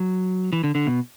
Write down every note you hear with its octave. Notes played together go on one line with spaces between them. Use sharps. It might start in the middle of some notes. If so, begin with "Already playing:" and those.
Already playing: F#3
E3
D3
D3
B2